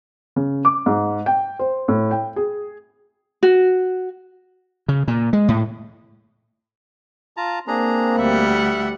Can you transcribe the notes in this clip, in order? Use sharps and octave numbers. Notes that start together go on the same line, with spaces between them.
C#3
D6
G#2
G5
C5
A2
G5
G#4
F#4
C#3
A#2
G#3
A2
F4 A5 A#5
A#3 C4 D4 G#4 A#5
D2 G3 E5 F#5